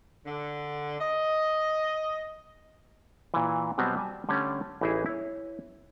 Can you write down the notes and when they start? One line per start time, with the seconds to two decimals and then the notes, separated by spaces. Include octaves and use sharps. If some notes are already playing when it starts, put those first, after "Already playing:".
0.25 D3
0.99 D#5
3.34 A#2 E3
3.78 B2 F#3 G3 B3 C4
3.97 G3 G#5 A5
4.29 D3 G3 A3 C#4
4.81 A1 E3 D#4 E4 G#4 E5
5.06 E4 C#5